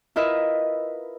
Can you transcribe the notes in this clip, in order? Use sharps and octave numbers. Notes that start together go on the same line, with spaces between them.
E4 F4 A#4 B4 D#5 E5